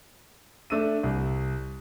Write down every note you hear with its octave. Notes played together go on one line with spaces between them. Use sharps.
A3 D4 E6 D#7
C2